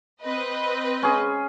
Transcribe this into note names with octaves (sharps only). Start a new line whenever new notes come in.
C4 B4 D#5
C#4 G#4